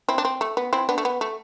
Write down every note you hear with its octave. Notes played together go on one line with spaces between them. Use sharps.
C4 E4
D4
C4
A3
B3
C4 E4
B3 D4
A3
B3
A3